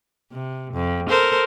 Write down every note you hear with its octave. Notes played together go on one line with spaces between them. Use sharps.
C3
F2
A4 A#4 C5